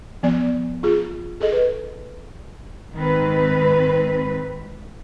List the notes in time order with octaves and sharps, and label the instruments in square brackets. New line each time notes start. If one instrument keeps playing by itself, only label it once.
[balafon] F3 B3 D5
F4 G#4
G#4 A4 D#5
B4
[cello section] G#2 D#3 C4 B4